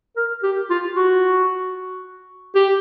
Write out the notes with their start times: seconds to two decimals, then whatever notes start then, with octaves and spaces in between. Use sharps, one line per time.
0.16 A#4
0.43 G4
0.70 F4
0.96 F#4
2.55 G4